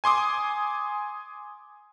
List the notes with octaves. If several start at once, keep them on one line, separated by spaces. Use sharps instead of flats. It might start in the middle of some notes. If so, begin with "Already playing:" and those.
G#5 C6 D6 D#6